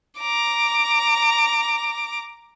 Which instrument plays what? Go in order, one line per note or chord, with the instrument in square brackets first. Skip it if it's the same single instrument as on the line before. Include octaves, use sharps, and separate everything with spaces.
[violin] A#5 D6